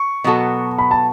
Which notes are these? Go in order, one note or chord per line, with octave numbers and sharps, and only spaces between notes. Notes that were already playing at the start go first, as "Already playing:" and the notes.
Already playing: C#6
B2 F#3 B3 F#4 A4
B5
A5